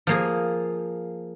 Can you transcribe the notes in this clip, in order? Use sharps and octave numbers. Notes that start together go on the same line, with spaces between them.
F3 A#3 G#4